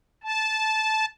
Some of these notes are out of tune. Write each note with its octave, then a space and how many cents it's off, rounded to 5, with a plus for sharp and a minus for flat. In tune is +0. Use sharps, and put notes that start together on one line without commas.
A5 -15